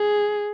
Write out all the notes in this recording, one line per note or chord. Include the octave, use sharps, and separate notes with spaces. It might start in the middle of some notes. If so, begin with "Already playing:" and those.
Already playing: G#4